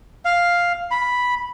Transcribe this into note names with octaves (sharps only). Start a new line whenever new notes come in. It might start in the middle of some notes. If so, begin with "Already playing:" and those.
F5
B5